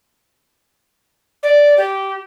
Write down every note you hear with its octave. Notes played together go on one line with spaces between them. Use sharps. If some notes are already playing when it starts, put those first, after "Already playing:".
D5
G4